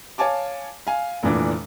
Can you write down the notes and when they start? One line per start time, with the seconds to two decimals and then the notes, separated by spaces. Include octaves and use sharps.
0.18 C#5 F5 G#5 A5 D6
0.87 F5 G#5
1.23 F1 A#2 E3 D4